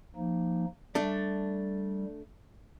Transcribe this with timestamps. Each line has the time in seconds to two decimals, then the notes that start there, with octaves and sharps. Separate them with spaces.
0.16 F3 A#3 D#4
0.95 G3 A3 D4